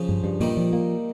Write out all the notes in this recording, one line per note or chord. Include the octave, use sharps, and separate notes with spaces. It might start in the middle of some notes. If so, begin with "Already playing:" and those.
Already playing: C#3 F3
G2
G2
A#2 D#3 G3
F3
A#3